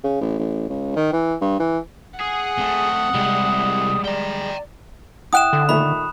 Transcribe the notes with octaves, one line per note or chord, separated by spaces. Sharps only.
C#3
A1
A1
C#2
D#3
E3
G2
E3
G#4 F#5
A3 C4 D#6
C2 G3 G#3
D5 G5 A#5
E4 F#5 G5 D#6 F#6 E7
D3
A#2 D#3 A3 E5 B5